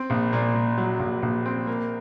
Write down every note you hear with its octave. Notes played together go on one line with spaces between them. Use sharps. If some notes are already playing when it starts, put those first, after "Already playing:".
Already playing: C4
A#1
A#2
A#2
F#3
A#1
A#1
C4
A#3